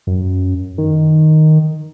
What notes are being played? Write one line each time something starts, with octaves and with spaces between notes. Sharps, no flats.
F#2
D#3